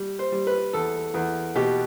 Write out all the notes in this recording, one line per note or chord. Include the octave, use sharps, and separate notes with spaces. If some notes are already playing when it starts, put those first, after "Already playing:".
Already playing: G3
C5
G3
B4
E2 A4
E2
B2 G4